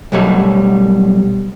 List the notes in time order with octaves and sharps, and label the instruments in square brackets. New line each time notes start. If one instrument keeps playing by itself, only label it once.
[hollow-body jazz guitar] B1 B2 F#3 G3 A3 C#5